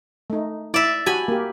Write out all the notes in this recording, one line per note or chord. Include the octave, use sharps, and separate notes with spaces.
A3 D#4
E4 D5 E5
F#4 G4 G#5 A5 B5
A#3 G4